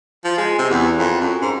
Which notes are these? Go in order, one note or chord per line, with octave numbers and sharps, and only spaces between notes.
F3
G#3
C3
E2
F2
F#2
G#2